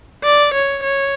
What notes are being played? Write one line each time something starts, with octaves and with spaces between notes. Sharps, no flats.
D5
C#5
C#5